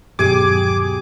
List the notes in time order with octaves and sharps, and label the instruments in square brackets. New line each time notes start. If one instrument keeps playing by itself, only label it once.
[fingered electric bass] D#1 G2 F#3 [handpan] B2 G4 [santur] G#4 G#5 [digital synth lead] D6